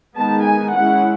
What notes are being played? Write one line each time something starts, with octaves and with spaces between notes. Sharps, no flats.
D#3 G#3 B3 D#4 A5
G#5
G#3 C#4 E4 F#5